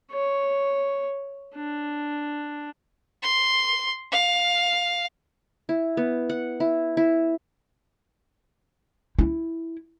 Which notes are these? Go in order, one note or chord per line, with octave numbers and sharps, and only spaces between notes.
C#5
D4
C6
F5
E4
B3
F#5
E4
E4
E4